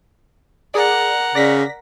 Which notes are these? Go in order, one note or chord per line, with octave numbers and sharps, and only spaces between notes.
G#4 A#4 D5 F#5
C#3 D5 A#6 B6